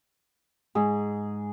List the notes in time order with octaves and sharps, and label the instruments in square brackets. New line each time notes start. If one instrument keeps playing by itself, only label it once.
[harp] G#2 [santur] G#4